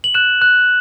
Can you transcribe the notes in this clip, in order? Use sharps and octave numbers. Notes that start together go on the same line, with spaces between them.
F#7
F#6 E7
F#6